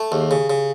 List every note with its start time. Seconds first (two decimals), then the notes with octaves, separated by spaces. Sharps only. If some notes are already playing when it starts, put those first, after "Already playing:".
Already playing: A3
0.11 D#2 G#4
0.21 G4
0.30 C#3 G#4
0.50 C#3